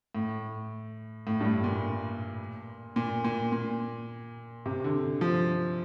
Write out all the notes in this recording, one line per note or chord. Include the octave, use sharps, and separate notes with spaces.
A2
A2
G2
A2
A#2
A#2
A#2
A#2
C3
D3
F3